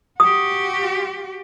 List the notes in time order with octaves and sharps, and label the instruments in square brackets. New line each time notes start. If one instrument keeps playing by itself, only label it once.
[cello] F#4 G4 [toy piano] D#6